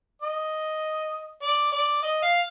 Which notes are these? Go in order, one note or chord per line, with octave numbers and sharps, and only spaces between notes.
D#5
D5
D5
D#5
F5